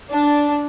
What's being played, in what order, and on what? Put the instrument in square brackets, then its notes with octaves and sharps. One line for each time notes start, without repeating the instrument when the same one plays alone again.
[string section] D4